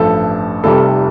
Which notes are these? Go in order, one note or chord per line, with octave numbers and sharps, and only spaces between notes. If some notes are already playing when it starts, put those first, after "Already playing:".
Already playing: A1 G2 F3 A4
F1 F2 C3 G3 A4